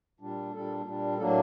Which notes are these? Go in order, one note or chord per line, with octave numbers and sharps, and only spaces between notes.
A#2 G3 D4
A#2 G3 D4 A4
A#2 G3 D4
A2 F#3 A#3 D4 A4